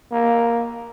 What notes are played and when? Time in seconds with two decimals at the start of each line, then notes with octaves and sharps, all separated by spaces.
0.11 A#3